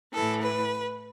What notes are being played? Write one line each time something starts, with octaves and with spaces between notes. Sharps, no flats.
A2 E3 A4
B4